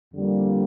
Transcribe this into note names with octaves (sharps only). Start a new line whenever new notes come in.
F2 D3 G3 A#3